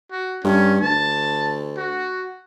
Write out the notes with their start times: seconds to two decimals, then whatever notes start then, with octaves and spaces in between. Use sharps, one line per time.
0.11 F#4
0.44 G2 C#4
0.81 D2 A5
1.77 F#4